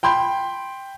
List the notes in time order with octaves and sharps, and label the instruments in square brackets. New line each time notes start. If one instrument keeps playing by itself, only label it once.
[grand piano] G5 B5 C6 G6